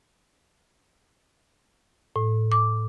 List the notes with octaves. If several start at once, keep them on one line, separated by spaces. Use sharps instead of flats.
A2
D6